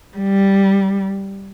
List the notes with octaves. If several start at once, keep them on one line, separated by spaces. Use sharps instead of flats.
G3